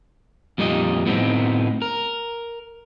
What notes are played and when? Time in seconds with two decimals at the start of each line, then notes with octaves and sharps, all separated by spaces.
0.58 F2 A#2 G3 D#4 D#5
1.06 A2 B3 C4 D4 D#4
1.82 A#4